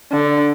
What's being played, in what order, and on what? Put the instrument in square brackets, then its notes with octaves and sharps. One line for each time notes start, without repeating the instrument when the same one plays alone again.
[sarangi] D3